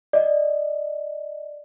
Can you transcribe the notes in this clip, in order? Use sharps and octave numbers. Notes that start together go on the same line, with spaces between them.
D5 D#5